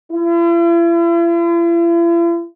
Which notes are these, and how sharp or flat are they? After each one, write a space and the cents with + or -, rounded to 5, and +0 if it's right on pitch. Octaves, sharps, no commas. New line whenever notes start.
E4 +45